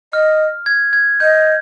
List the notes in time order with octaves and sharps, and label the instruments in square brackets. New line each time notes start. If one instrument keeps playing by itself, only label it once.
[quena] D#5 [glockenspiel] F6
[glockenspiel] G#6
G#6
[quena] D#5 [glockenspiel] G6